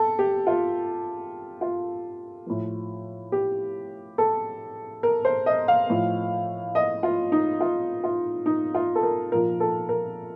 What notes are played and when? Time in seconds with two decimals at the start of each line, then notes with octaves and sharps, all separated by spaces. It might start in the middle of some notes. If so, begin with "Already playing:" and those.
Already playing: A4
0.19 G4
0.47 F4
1.61 F4
2.46 A2 F3
3.32 G4
4.18 A4
5.03 A#4
5.25 C5
5.46 D#5
5.68 F5
5.89 A2 F3
6.75 D#5
7.03 F4
7.32 D#4
7.61 F4
8.04 F4
8.46 D#4
8.75 F4
8.95 A4
9.03 A#4
9.32 A#2 F3 A#4
9.60 A4
9.89 A#4